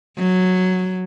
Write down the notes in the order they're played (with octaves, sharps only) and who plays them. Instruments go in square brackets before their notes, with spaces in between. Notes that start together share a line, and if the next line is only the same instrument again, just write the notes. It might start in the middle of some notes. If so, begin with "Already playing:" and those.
[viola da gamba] F#3